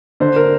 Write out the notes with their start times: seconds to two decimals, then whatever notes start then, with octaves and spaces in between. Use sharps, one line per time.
0.20 D3 C5
0.36 A#4